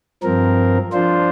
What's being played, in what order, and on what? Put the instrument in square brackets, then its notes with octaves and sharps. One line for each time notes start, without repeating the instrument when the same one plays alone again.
[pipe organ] G2 F3 C4 A#4
F3 D4 F4 C5